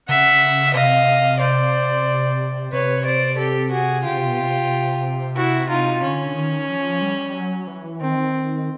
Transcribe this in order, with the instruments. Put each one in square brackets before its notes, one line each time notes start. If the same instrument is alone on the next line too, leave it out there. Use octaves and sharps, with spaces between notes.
[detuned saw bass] C#3 [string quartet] E5 F#5
[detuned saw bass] C3 [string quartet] D#5 F5
[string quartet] C5 D5
[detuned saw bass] C3 [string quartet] B4 C#5
[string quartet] C5 D5
G4 A4
F#4 G#4
[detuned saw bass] C#3 [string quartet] F4 G4
[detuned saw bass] C3
B2
C3
[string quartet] E4 F#4
D#4 F4
[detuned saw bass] D3 [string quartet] C#4
[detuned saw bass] D#3
F3
G3
F#3
E3
[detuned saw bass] D#3 [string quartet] C4